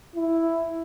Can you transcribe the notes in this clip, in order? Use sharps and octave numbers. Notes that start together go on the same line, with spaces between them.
E4